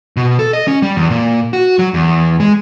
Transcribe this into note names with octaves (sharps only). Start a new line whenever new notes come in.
B2
A4
D#5
C#4
G3
E2
A#2
F#4
F#3
E2
G#3